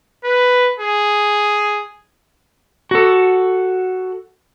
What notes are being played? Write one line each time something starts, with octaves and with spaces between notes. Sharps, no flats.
B4
G#4
F#4 A4